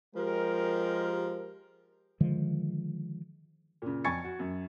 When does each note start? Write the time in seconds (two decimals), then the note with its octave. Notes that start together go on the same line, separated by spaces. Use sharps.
0.15 F3 G#3 G4 A#4
2.20 D3 D#3 F3 G#3
3.82 A#2 C#3
4.04 F2 G#5 C#6 G#6 A6 C#7
4.24 F#4
4.39 F#2